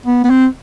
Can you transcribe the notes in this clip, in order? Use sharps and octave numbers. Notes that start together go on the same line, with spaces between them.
B3
B3
C4